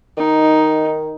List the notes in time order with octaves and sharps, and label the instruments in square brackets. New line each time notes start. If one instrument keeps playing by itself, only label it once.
[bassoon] D#3 [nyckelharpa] D#4